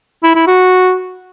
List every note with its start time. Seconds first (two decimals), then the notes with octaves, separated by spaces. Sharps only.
0.23 E4
0.35 E4
0.47 F#4